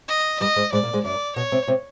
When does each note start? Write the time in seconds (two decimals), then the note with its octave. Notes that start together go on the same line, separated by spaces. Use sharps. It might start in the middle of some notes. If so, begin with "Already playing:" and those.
0.08 D#5
0.40 G2 G3 D#5
0.56 G#2 G#3
0.72 G#2 G#3 D5
0.83 A#2 A#3
0.93 G#2 G#3
1.04 F#2 F#3 D5
1.36 B2 B3 C#5
1.52 C3 C4
1.67 C3 C4